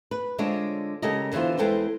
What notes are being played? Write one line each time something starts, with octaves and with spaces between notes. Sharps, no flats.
B4
D3 G#3 C4 D4 F4 C#5
C#3 G#3 G4 A4 A#4 D#5
D3 E3 B3 F4 C5
E2 G#3 C4 A4 B4 G5